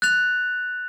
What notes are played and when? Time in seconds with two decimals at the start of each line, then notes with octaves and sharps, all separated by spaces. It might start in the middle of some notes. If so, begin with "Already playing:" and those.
0.02 F#6 A6 F7